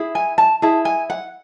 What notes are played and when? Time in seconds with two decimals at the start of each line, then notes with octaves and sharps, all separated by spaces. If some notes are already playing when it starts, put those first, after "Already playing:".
Already playing: E4 G#4
0.15 G#5
0.38 A5
0.62 E4 G#4 A5
0.85 G#5
1.10 F#5